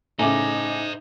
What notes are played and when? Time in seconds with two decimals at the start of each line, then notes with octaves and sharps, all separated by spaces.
0.19 A2 C#3 D#4 C5 D#5 G#5 D6